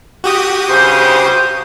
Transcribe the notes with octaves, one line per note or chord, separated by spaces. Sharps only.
F#4 G4 D#6
G2 C#3 C5